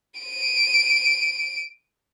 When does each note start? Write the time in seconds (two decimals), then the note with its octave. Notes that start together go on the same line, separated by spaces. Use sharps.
0.20 D7 D#7